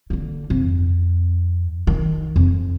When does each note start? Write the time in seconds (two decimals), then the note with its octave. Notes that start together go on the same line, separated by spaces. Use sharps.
0.10 D3 A#3
0.50 F2
1.87 D#3
2.36 F2